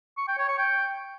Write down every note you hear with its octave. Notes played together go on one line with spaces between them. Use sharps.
C#6
G5
C#5
C#6
G5